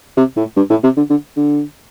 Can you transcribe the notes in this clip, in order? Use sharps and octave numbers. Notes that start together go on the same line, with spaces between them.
C3
A2
G2
A2
C3
D3
D3
D3